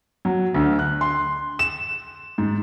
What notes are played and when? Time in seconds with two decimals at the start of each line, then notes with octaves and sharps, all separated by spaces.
0.25 F#3
0.54 D2
0.79 F#6
1.01 C6
1.59 E7
2.38 G#2